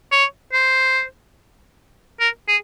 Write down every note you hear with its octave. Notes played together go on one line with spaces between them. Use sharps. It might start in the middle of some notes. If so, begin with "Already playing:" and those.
C#5
C5
A#4
G#4